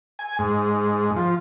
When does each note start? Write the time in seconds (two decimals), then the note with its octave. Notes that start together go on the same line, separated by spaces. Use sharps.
0.19 G#5
0.39 G#2
1.16 F3